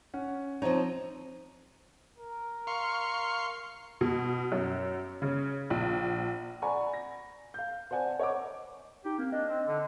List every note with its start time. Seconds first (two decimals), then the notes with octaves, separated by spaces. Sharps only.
0.14 C#4 F#5
0.62 F3 C4 D#4 C#5 A#5
2.17 A#4
2.67 F5 C6 C#6
4.01 B2
4.52 F#2
5.22 C#3
5.70 A#1
6.62 D5 F#5 G#5 A#5 B5 C#6
6.94 A#6
7.54 F5 G6
7.91 C5 D5 F#5 G#5 A5
8.19 C#5 D#5 F#5 D6
9.05 D#4 G4
9.18 A#3 C4
9.32 D4 D#5
9.48 C4
9.67 D3